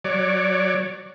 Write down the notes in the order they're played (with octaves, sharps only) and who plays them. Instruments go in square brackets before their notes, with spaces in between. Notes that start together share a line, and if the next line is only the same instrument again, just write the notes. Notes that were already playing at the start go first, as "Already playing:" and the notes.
[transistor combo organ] F#3 C#5 D5